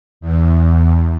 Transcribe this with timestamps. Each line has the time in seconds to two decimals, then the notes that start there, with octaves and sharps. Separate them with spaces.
0.21 E2